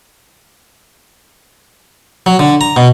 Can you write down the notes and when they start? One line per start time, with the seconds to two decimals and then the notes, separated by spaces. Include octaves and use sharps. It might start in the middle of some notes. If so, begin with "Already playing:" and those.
2.26 F#3
2.39 D3
2.61 A#5
2.77 B2